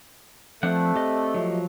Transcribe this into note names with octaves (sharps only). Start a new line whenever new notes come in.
F3 A3 C4 D4 F#5
G4 D#5
F3 F#3